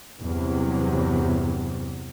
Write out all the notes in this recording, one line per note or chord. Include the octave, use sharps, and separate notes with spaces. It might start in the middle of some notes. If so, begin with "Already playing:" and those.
E2 G2 C3 F#3